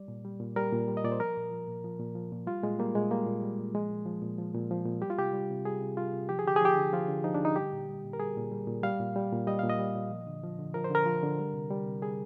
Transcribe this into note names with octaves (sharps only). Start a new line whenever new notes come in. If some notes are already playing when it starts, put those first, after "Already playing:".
Already playing: G3 D5
A#2
G3
A#2
G3 A#4
A#2
G3
D#5
A#2 D5
C5
F3 A#4
A#2
F3
A#2
F3
A#2
F3
A#2
G3 F4
A#2 G#3
G3 A#3
A#2 G#3
G3 A#3
A#2
G3
A#2
F3 G#3
A#2
F3
A#2
F3
A#2
F3
A#2
G3 G4
F4
C3 G4
G3
C3
G3 G#4
C3
G3 F4
C3
F3 G4
G#4
D3 G4
G#4
F3 G4
D3
F3 F4
D3
F3 D#4
D4
D3 D#4
G3 G4
A#2
G3
A#2
A#4
G3 G#4
A#2
G3
A#2
G3 F5
A#2
G3
A#2
G3 D#5
A#2 F5
D#5
G3
A#2
F3
D3
F3
D3
F3 A#4
C5
D3 A#4
F3
D3
G3
C3
G3
C3
G3 G#4